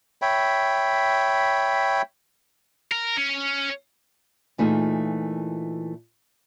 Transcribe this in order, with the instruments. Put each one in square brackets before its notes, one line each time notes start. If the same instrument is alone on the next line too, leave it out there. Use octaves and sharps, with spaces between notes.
[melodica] C#5 E5 G5 B5
[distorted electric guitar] A#4
C#4
[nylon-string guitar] A#2 E3 A3 D#4 F4 G#4